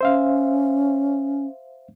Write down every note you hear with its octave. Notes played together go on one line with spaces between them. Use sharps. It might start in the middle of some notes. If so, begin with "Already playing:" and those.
C#4 C5 E5 F5